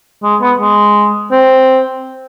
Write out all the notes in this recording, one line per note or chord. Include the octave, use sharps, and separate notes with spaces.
G#3
B3
G#3
C4